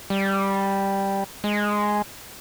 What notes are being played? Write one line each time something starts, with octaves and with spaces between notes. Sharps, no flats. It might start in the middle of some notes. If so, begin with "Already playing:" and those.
G3
G#3